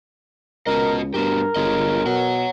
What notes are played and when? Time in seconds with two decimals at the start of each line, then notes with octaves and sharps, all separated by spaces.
0.67 C#2 B3 F#4 A#4 D#5
1.14 G2 B3 F#4 G4 A#4
1.56 G1 F4 G#4 D#5
2.06 B2 C#5 F#5